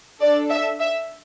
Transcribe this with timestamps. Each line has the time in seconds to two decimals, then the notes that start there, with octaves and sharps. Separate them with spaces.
0.21 D4 A4 D5
0.50 E5
0.80 E5